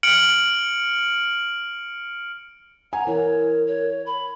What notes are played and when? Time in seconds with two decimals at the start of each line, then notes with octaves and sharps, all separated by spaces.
0.03 F6 C#7 D7 F#7
2.93 F#5 G#5 A#5
3.07 E3 A#4 C#5
3.68 C#5
4.06 B5